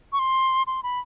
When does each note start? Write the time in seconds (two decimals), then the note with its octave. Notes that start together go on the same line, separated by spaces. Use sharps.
0.13 C#6
0.19 C6
0.67 C6
0.83 B5